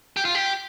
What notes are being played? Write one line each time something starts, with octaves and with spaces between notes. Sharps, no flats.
G4
F4
G4